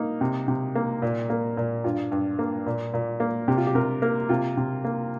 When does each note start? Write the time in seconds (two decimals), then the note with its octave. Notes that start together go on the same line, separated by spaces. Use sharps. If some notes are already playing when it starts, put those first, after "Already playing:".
Already playing: A#3 D#4
0.21 C3
0.48 C3
0.75 A#3
1.02 A#2
1.30 A#3
1.57 A#2
1.84 G2 F4
2.12 G2
2.39 A#3
2.66 A#2
2.94 A#2
3.20 A#3
3.48 C3 G4
3.58 F4
3.67 G4
3.75 C3 A#4
4.02 A#3 A#4
4.29 C3 F4
4.57 C3
4.85 A#3